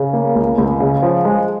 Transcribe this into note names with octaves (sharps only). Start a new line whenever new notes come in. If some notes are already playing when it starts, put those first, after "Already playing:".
Already playing: C#3
A#3
C#2
C#2
C#3
F3
G#3